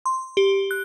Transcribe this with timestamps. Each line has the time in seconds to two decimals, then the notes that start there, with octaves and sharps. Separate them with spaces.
0.06 C6
0.37 G4
0.71 F#6